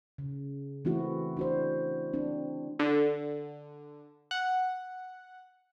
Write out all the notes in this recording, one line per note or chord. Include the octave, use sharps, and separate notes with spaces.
C#3
E3 A3 C4 E4 F#4
D4 F#4 C5
C4 D4
D3
F#5